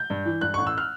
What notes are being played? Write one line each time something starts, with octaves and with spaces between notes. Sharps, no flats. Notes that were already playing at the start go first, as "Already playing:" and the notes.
Already playing: G6
G2
E3
G2 F#6
C#6
A1
E6
F6